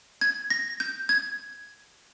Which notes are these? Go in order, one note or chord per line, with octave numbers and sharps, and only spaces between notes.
G#6
A#6
G6
G#6